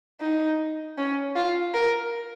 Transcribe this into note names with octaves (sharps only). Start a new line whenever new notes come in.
D#4
C#4
F4
A#4